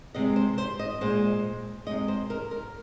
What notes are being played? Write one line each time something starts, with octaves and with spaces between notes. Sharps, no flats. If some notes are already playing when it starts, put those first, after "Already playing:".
C3 G#3 D#5
C5
C5
D#5
A#2 G#3 C5
C3 G#3 D#5
C5
A#4
A#4